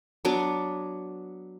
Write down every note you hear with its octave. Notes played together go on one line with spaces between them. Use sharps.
F#3 B3 D4 D6